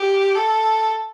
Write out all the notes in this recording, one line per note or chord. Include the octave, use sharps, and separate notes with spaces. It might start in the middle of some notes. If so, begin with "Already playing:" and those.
Already playing: G4
A4